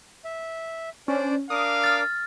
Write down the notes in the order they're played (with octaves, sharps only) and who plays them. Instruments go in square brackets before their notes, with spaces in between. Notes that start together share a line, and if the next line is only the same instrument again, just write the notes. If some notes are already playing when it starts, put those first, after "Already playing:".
[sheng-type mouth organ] E5
[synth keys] C#4 [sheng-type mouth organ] D4 C5 D5
[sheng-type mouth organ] D4 A#4 D6 [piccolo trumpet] F5 [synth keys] D#6
[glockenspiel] F6 A6